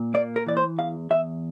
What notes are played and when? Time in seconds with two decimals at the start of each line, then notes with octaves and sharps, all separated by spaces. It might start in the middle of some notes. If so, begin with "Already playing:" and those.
Already playing: A#2
0.14 A#3 D5
0.36 A#4
0.46 E3 D5
0.57 C5
0.78 E2 F5
1.10 E2 E5